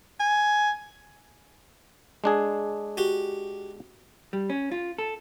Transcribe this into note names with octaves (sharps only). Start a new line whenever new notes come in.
G#5
G#3 D4 G#4
F#4 G4
G3
C#4
F4
A4